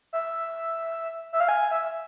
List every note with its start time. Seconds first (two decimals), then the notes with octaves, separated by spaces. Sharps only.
0.13 E5
1.33 E5
1.40 F5
1.49 G#5
1.71 E5